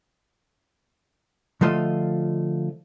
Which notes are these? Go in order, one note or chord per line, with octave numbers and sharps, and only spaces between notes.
D3 F3 A3 F4 D#5